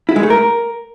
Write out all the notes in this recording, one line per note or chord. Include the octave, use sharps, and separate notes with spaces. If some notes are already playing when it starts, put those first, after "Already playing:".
E4
G#3
A3
A#4